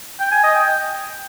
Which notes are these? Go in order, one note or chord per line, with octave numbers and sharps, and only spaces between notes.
G5
G#5
D#5
G5